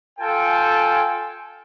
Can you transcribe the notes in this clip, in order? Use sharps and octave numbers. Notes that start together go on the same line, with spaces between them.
F4 A4 G5 G#5